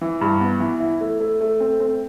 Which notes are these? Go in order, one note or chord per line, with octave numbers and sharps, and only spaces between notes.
E3
G2
B3
E3
E4
A3
A3
A3
C4
C4